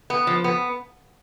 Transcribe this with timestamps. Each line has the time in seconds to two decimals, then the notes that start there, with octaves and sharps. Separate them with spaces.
0.10 B3
0.27 F3
0.44 B3